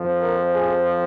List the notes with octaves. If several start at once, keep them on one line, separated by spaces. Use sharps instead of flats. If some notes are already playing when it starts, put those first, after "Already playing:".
Already playing: F2 F3
A#4
G#4